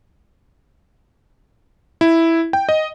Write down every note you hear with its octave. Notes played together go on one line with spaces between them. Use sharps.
E4
G5
D#5